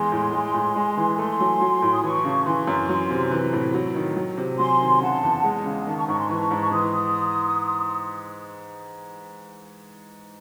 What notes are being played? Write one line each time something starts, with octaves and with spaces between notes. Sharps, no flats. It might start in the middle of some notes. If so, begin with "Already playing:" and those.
Already playing: E2 G#3 G#5 C6
A2
G#3
A2
G#3
E3
A3 G#5 C6
F#3
F#3
A2
D#6
E3 A5 C#6
C#3
E3 G#5 C6
F#2
F#3
C3
E3
A2
F#3
D#3
F#3
C3
F#3 G#5 C6
D#3
C#3 F#5 A5
E2
G#3
C#3
D#3 F#5 A5
A5 C#6
G#2 A5 C#6
G#5 C6
E3 A5 C#6
G#2
C#6
E3 C6 D#6